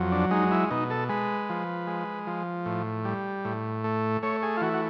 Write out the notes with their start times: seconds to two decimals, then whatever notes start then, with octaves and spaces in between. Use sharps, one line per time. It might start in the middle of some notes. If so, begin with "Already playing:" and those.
Already playing: F2 F#3
0.12 D4
0.31 G#3 D#4
0.51 E4
0.70 B2 D#4
0.90 A4
1.09 G#3 B4
1.49 F3
1.87 G#3
2.27 F3
2.66 A2
3.05 G3
3.45 A2
3.84 A3
4.23 A3 C#5
4.43 G#4
4.57 F4
4.61 E3 F#4
4.73 F#4